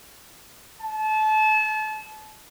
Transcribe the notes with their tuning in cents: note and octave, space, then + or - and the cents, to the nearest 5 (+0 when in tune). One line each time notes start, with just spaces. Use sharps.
A5 -30